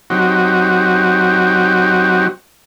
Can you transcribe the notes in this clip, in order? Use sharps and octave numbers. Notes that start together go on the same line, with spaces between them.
F#3 C4 D#4 F#4 G4